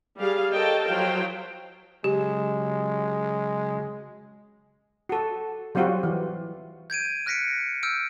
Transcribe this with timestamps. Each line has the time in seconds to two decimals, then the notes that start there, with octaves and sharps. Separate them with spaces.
0.19 G3 G#4 F5
0.54 A4 A#4 C#5 D#5 G5 A5
0.86 F3 F#3 C5 F5 G5
2.04 C#3 F#3 G#3 G4
5.09 F#4 A4
5.75 F#3 G3 C4 F4 F#4
6.03 E3
6.90 G6 G#6 D7 D#7
7.26 F6 F#6 A#6 B6 C#7 D7
7.83 E6 F6 G6 D7